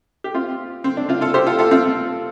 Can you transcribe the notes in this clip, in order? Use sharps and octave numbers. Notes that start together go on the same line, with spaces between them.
G4
C4 F4
C4
D4
C4 F4
F4 A4
G4 C5
F4 A4
F4 A4
C4 F4